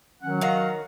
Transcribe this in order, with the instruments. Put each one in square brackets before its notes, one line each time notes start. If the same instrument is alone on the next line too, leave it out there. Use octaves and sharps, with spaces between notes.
[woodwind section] D#3 C#4 F#5 [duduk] F#3
[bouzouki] D#3 A#5 [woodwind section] F5 F#5